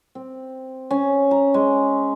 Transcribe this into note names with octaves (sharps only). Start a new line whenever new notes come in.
C4
C#4
A#5
G#3